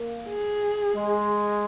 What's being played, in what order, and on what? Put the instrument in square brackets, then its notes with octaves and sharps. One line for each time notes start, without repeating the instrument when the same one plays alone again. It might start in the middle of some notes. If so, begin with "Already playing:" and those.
Already playing: [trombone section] A#3
[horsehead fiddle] G#4
[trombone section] G#3